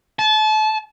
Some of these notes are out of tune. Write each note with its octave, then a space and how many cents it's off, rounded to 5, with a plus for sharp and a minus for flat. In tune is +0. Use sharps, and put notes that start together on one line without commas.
A5 -30